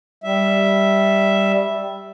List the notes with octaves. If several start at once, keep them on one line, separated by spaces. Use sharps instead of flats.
G3 E5